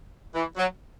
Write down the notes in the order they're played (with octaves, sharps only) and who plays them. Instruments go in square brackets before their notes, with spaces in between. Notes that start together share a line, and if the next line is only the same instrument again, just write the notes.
[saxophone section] E3
F#3